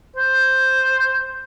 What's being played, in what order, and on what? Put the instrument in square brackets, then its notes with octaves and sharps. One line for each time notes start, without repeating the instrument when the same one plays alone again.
[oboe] C5